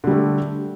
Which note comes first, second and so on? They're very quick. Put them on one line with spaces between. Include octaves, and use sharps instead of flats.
D3 G3 A3